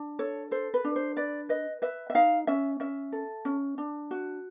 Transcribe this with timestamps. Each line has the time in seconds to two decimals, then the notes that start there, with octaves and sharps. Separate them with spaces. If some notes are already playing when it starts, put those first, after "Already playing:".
Already playing: D4
0.19 A4 C#5
0.51 A4 C5
0.74 B4
0.85 D4
0.96 C5
1.16 B4 D5
1.49 B4 D#5
1.82 B4 E5
2.10 E5
2.15 D#4 F5
2.47 C#4 E5
2.80 C#4 E5
3.12 A4
3.45 C#4
3.78 D4
4.11 F#4